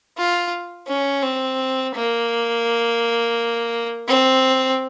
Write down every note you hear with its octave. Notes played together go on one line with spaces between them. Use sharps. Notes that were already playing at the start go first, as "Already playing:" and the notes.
F4
C#4
C4
A#3
C4